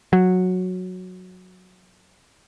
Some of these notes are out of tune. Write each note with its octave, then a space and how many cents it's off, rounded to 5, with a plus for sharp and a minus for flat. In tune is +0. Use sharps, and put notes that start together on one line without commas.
F#3 -10